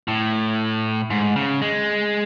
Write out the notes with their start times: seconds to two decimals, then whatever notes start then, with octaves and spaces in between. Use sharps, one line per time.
0.08 A2
1.10 G#2
1.36 C#3
1.62 G#3